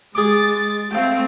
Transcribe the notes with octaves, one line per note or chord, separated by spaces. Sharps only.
G#3 G#4 D6 A6
A3 C4 F5 G5